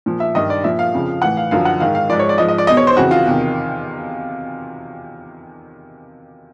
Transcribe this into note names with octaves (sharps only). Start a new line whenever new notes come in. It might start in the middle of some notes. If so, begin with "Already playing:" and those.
A#2 F3
E5
G2 D#3 D#5
D5
A#2 F3 E5
F5
F2 C#3 F3
A2 E3 F#5
F5
F#2 D3 F3 F5
F#5
G#2 D#3 F5
F5
G#2 F3 D5
C#5
D5
G#2 F3 D#5
D#5
D5
E2 B2 D#5
C#5
C5
F2 C#3 E3 F#4
F4
E2 C3 D#3